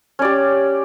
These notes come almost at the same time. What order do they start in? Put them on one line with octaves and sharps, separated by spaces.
C#4 D5 G4